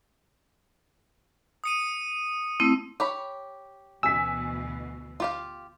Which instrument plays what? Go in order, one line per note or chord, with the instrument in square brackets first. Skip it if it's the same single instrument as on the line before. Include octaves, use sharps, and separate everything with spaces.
[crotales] D#6 C#7 D#7
[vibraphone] A3 C4 E4
[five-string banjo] G4 C#5 B5
[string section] D2 B2 E3 [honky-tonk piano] G#5 B6 [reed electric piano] E6
[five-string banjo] F4 G4 F5